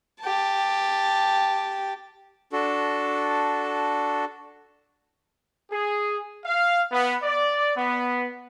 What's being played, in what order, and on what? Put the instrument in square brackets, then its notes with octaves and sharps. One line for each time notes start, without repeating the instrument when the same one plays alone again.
[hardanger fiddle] G4 A5
[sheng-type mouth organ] D4 F#4 A4
[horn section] G#4
F5
B3
D5
B3